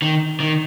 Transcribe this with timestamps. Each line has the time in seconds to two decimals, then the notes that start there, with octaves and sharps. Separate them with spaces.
0.02 D#3
0.40 D#3